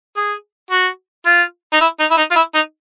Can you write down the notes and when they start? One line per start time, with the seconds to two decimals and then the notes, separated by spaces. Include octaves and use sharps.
0.16 G#4
0.71 F#4
1.26 F4
1.73 D#4
1.81 E4
2.00 D#4
2.11 E4
2.17 D#4
2.31 F4
2.36 E4
2.55 D#4